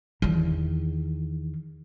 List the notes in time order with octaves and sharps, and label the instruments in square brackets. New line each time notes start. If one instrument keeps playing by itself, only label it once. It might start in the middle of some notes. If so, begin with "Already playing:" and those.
[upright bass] E2 D#3